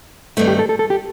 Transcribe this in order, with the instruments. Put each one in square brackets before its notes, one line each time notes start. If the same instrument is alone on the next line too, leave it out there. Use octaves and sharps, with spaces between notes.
[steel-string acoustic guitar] G2 D#3 A3 C4
[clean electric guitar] G4
A4
A4
A4
G4